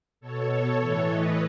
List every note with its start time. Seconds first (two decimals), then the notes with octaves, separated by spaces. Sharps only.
0.21 B2 A4 C#5
0.79 A2 E3
1.08 B4 D#5